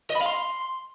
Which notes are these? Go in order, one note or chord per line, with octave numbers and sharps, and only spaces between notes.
D#5
B5
F5
C6